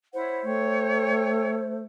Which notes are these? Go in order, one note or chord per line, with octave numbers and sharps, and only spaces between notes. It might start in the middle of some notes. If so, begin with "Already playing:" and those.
E4 C5 C#5 F#5
A3 C#5 G5